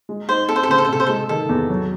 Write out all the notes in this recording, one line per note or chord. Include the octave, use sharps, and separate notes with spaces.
G#3
D#4 C5
C4 A4
C5
A4
C#3 C5
A4
C5
C3 A4
C5
G#3 A4
D#3 A4
E2
F#3